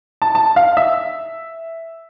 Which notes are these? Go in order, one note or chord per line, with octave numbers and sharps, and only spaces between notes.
A5
A5
F5
E5